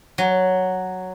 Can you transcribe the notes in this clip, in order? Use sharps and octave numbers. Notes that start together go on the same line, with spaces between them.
F#3